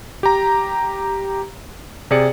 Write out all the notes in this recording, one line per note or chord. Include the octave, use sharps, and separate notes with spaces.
G4 A#5
C3 G#4 D5 C#7